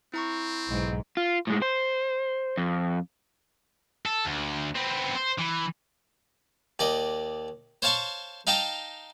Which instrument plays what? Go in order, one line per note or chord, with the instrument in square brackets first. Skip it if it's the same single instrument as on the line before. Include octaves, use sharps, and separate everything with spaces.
[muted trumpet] C4 [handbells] E4 A#5 C#6
[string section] B1 G#2
[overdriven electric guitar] F4
A2 G#3
C5
F2
[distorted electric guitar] A4
D2
B3 C4
C5
E3
[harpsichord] D#2 D5 D#5
C5 C#5 F5 A5 C6 C#6
D#4 F5 G5 A5 A#5